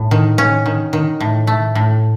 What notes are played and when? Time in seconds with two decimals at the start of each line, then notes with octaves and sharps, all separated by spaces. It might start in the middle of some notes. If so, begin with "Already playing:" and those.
Already playing: A2
0.11 D#3
0.38 C#4
0.66 D#3
0.93 D#3
1.20 A2
1.47 A3
1.75 A2